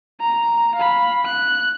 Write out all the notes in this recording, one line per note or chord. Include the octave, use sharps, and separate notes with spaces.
A#5
F5 B5
F#6